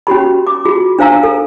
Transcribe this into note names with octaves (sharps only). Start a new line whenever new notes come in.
C#4 F#4 G4 B5
D6
F4 F#4 G#4
D4 C5 F5 A#5 E6
A4